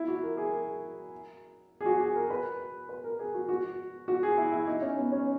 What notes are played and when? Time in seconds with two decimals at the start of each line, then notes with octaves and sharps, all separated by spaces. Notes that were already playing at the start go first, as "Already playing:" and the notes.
Already playing: E4
0.08 F#4
0.23 A#4
0.37 G#4
0.52 A#4
1.81 G#4
1.86 F#4
2.00 G#4
2.15 A#4
2.30 B4
2.89 B4
3.04 A#4
3.19 G#4
3.34 F#4
3.49 F#4
4.08 F#4
4.23 G#4
4.38 E4
4.52 E4
4.67 D#4
4.82 C#4
4.97 B3
5.12 C#4